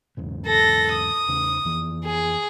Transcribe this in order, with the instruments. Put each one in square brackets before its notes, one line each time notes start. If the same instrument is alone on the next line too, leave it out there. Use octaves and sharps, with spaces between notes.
[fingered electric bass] E2 G#2 C#3
[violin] A4 A#6
D#6
[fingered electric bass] E2 C#3 C#4
F2 E3
[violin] G#4